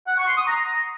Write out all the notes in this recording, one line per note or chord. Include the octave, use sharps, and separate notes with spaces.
F#5
C#6
C6
D#6
A#5